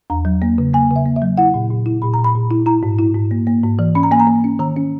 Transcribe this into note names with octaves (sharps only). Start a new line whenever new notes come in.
E2 A#5
F#3
A#3
C#3
A#3 G#5
C#3
E5
A#3
E5
F#3
E4 F#5
A#2
A#2
E4
A#2 B5
A#2 A#5
B5
A#2
E4
E4 A#5
G#2
E4
G#2
A#3
A#3
G#2
E3
C#4 B5
A#5
A#3 G#5
A#5
A#3
C#4
D#3 A#5
C#4